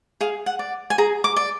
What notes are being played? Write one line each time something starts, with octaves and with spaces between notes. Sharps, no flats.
G#4 F5
F#5
D5
G#5
G#4 A#5
D6
D5